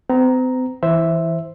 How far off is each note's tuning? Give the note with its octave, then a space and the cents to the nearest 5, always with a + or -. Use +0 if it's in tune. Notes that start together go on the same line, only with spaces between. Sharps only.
C4 -40 A#5 +0
E3 +0 C5 +0 E5 +0